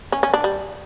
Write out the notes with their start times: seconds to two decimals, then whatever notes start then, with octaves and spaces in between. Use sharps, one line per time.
0.12 C#4
0.23 C#4
0.34 D4
0.44 G3